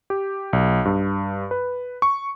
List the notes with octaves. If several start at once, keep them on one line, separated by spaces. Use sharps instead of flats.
G4
B1
G2
B4
C#6